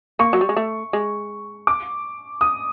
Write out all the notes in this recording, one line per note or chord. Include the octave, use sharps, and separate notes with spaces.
A#3 C#6
F#3
G3
G#3
A3
G#3
D6
D#6